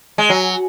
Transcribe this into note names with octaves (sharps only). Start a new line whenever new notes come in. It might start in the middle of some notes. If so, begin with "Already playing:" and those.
G#3
F#3